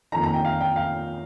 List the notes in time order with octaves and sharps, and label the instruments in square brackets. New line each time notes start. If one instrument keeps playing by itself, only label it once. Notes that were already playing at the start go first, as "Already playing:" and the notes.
[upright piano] F2 D#3 A#3 D#4 A#5
A#5
G5
F5
G5
F5